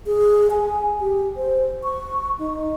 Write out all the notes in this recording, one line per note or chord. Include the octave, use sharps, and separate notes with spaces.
G#4
G#5
G4
C5
C#6
D#4